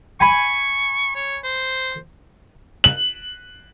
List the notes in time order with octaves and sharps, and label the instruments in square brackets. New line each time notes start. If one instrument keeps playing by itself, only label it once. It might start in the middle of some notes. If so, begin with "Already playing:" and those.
[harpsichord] G#5 B5 [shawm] C#6
[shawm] C#5
C5
[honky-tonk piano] F#7